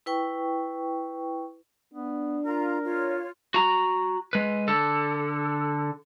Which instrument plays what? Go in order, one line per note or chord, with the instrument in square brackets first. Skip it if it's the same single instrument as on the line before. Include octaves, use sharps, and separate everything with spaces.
[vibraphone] E4 B4 G5 C#6
[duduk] B3 [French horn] D4
[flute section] F4 A#5 [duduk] A#4
[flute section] F4 C#5
[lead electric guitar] F#4 A#5
G#3 B4
D3 A4